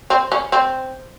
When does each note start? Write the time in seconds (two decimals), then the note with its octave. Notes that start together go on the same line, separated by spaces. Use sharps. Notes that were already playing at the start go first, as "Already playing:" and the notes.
0.10 C4
0.32 C#4
0.52 C4